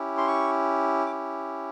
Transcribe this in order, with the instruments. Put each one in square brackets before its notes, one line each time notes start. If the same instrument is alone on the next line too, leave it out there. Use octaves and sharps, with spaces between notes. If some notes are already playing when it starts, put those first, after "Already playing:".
Already playing: [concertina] C#4 E4 G4
C6
C#6
D6